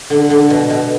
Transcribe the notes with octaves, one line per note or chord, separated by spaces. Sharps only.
D3
D3
B2
B2